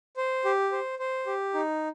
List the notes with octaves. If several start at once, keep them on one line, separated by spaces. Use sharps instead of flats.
C5
G4
C5
C5
G4
D#4